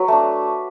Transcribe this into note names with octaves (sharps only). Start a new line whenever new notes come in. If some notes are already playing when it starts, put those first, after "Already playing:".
Already playing: F#3 F#4 B4
A3 D4